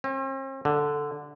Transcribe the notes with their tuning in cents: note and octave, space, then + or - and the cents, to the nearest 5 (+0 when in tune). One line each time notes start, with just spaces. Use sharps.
C4 +45
D3 +0